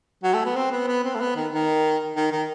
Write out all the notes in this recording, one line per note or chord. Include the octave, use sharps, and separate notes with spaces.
F#3
A3
B3
C4
B3
B3
C4
A3
B3
D#3
D#3
D#3
D#3